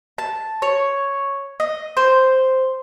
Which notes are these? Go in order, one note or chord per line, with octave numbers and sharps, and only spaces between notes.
A5
C#5
D#5
C5